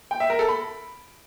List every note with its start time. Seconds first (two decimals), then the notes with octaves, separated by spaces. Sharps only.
0.11 G5
0.20 E5
0.30 A#4
0.39 A4
0.48 B5